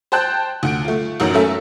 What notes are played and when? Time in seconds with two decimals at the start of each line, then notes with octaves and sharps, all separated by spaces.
0.12 C5 G5 A5 F#6 G6
0.63 D2 F#5 D7
0.85 A3 F4
1.20 A1 F#2 D#3 F#3
1.33 F#3 A3 C#4 A4 A#4 E5